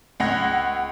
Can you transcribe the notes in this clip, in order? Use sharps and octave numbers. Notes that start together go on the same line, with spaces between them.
C#2 F#5 A#6